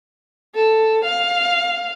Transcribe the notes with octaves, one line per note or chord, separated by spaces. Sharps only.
A4
F5